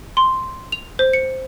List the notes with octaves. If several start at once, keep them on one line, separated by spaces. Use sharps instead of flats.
C6
F7
C5
C#7